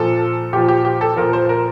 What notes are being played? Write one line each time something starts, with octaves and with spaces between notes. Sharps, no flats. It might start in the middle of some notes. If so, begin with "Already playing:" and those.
Already playing: A#2 F3 A4
A#2 F3 G4
G4
G4
A4
A#2 F3 A#4
C5
A#4